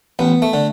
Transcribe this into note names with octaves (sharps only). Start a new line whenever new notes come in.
A1 B3
A3
D3